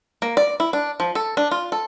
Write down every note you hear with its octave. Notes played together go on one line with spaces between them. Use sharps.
A#3
D5
E4
D4
F3
A4
D4
F4
A4